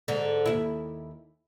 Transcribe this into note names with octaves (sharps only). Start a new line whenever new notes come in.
G#2 D3
D#2 E4